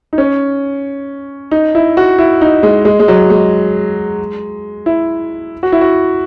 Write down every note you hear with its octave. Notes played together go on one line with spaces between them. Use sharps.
D#4
C#4
D#4
E4
F#4
E4
D#4
G#3
G#3
G#3
F#3
G#3
E4
F#4
E4
F#4